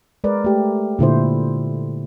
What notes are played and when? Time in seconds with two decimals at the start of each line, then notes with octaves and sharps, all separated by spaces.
0.24 G#3 A#4 B4 D5
0.44 A3 G4
0.99 A#2 D3 E4 C5